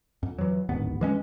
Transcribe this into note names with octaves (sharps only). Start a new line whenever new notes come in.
F2
E3 F#3
D1 G#1 D#2 B3
E3 G#3 C#4